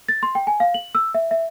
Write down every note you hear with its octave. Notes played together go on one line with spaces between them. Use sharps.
A6
C6
G5
G#5
F5
F#7
E6
E5
E5